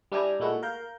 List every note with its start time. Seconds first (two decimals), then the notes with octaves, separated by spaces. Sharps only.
0.12 G3 D4 E4 G4 G#5 A#5
0.40 A#2 G#3 A3 E4 F#4
0.63 A#4 F5 G6